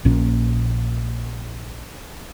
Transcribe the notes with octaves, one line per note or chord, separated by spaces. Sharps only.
A#1 A#2 C#4